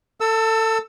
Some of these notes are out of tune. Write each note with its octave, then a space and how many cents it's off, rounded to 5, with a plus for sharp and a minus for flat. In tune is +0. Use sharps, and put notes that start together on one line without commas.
A4 +25 E6 +0